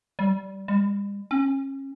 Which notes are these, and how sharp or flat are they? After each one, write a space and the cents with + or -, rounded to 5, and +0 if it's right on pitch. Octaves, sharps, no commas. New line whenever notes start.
G3 -20
G3 +45
C#4 -30